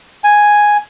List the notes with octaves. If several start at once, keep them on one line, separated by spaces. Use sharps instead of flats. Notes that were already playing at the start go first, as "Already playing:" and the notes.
G#5